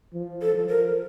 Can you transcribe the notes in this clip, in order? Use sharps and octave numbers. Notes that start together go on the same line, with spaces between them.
F3
A4
F3
A#4